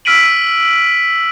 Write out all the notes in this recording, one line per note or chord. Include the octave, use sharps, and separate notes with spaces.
E6 F6 B6 D7 D#7 F#7